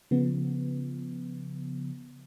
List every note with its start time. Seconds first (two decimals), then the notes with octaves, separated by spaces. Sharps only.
0.11 C#3 F3 B3